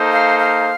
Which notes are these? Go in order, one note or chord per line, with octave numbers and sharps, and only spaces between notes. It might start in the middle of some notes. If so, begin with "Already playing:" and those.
Already playing: A#3 D#4 A4 C5
F5
F5